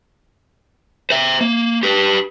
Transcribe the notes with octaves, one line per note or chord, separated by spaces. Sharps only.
C5 E5
A#3
G4 B4